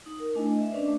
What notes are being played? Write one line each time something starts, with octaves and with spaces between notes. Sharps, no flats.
D#4
A#4
A3 D4 E4 D#5 G#5
D#5 E5
C#4 D4 B4 C5 D5
A3 D6